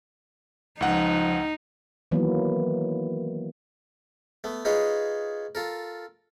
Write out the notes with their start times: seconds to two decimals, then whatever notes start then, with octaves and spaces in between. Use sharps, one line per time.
0.81 C#2 F3 D#4 F#5
2.11 D#3 E3 F#3 A#3 B3
4.44 A3 B3
4.65 D#4 F4 G#4 B4 C#5 D#5
5.55 F4 A4 A#4